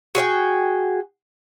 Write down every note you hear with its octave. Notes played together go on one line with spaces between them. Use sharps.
F#4 G#4 C#5 G5